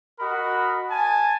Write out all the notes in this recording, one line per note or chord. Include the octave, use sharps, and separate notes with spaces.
F#4 A#4 D#5 B5
G#5 A5